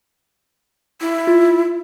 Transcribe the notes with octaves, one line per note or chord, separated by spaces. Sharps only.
E4
F4